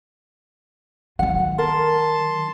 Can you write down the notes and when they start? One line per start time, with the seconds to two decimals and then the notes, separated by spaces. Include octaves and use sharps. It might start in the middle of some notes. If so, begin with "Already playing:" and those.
1.19 D#3 F#3 F#5
1.58 A#4 A5 C6